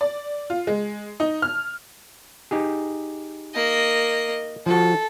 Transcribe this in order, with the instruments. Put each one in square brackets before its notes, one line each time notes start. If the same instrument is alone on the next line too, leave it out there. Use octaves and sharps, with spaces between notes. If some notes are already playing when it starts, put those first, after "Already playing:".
[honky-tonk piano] D5
F4
G#3
D#4
F6
[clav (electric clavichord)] D#4 G4 G#4
[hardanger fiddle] A#3 D#5
[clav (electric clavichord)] F3 F4 F#4 [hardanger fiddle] A4